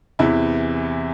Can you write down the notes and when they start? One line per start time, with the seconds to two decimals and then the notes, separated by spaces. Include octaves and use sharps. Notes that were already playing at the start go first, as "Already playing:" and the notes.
0.19 E2 C3 E3 E4